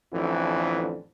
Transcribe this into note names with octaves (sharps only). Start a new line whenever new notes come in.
A1 F2 D3 E3